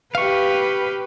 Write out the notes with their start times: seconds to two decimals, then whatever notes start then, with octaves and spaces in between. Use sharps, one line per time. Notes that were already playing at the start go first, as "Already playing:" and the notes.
0.15 G4 B4 F5 C#6